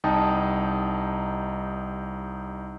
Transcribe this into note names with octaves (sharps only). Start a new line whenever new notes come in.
C2 D#4 G5 A5 D#6